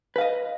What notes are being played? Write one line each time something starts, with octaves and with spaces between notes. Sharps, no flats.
B4 D#5 F5